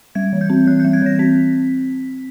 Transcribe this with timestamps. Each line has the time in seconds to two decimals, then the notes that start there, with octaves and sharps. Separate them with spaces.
0.15 G3 G#6
0.33 E3
0.41 G6
0.50 C4
0.67 E3 F#6
0.80 G6
0.84 G3
0.93 G#6
1.02 E3 A#6
1.19 C4 B6